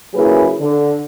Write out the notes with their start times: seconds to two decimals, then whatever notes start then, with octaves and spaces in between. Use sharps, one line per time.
0.14 C#3 F#3 A#3 E4 G#4 B4
0.59 D3